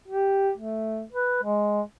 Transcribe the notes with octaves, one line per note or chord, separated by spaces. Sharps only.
G4
A3
B4
G#3